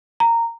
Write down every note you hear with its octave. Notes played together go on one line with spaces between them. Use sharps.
A#5